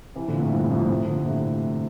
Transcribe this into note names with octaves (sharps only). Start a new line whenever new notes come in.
C3 E3
A#2 D3
A2 C3
G2 A#2
F2 A2
A2 C3
A#2 D3
A2 C3